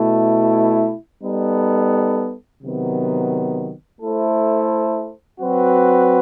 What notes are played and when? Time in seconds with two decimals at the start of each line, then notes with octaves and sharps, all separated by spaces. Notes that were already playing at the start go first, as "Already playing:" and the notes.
Already playing: B2 A3 E4
1.23 G3 B3 D#4 A4
2.62 C3 D#3 F#3 B3
4.01 A3 E4 A4 C5
5.40 F#3 C4 F#4 B4